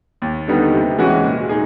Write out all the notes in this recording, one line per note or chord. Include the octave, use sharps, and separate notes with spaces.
D#2
D3 G3 B3 D#4
C3
E3 G#3 C#4 F#4
A#2
D#4 G#4